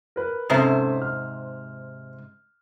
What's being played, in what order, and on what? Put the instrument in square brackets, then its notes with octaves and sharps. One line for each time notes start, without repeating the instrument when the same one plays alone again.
[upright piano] A#4 B4
[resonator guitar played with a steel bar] G#2 C3 C5 [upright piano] C#4 A4 E5
[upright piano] F6